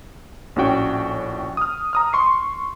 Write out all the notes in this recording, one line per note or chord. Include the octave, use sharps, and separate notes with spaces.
A#1 A2 C#4 F#4 G5
D#6 F6
A#5 D#6 F6
C6 C#6 C7